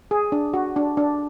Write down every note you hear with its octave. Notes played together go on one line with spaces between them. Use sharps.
G#4
D4
F#4
D4
D4